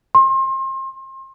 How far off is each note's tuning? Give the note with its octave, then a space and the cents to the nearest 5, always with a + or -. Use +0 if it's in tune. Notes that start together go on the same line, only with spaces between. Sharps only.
C6 +35